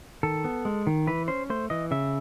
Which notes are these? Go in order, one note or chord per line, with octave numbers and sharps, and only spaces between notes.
D#3 A4
B3
G#3
D#3
E3 B4
C#4 C5
A3 C5
E3 D#5
C#3 E5